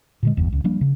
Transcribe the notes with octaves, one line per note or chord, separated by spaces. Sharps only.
A#2 D3 G#3
G1 E2
C#2
F3 G3 A#3 D4
C#3